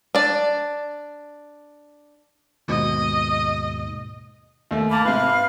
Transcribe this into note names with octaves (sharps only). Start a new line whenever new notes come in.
D4 D5
D#2 G#2 B2 D#5
D#2 A3
A#3 A5 B5 D6
G#2 C3 B4 F5 F6